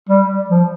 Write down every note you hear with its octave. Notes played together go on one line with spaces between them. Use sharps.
G3
F3